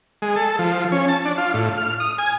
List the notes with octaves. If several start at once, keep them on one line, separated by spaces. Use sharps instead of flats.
G#3
A4
F3
C#4
A5
D4
F4
A2
F6
D#6
G#5